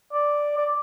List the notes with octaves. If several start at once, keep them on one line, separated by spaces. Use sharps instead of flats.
D5
D5